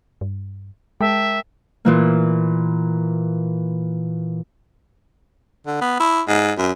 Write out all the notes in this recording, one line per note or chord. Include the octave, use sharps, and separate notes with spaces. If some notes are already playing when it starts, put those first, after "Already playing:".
G2
G#3 A#4 E5 G5 A5
A#2 E3 A#3
D3
B3
E4
G#2
F#2